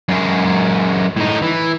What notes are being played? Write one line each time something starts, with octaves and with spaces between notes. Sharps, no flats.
F#2 G#3
A2 D#4
E3